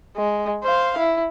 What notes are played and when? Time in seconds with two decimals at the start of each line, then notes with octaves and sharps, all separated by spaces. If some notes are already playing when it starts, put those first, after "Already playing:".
0.17 G#3
0.63 C5 F5
0.98 E4